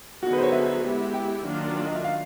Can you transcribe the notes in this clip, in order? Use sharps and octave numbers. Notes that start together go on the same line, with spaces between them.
D3 F#3 B3 D#4 F#4 G#4
B4
C5
C#5
E5
G#3 B3 E4 G4
G5
D#3 F#3 A#3 D4 F4
D5
D#5
E5
F5